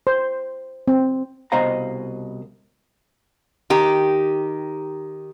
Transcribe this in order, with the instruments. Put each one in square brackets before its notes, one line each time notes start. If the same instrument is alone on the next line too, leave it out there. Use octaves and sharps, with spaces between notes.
[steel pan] C5
C4
[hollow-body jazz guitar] C2 B2 C5 D#5 F5 A#5
[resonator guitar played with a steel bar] D#3 G4